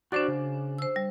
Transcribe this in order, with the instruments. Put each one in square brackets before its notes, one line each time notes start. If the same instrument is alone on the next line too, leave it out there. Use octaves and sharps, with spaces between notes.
[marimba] D4 C5 A6 [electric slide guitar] F#4 D5
[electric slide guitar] C#3
[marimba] C5 E6
G3